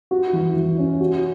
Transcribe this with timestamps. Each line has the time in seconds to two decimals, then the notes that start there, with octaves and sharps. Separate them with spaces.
0.11 F#4
0.33 E3
0.56 E3
0.78 C#4
1.00 F#4